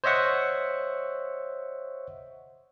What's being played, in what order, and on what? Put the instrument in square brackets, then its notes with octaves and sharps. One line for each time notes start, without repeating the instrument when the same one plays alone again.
[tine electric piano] C5 C#5 D#5 E5 F#5 C#6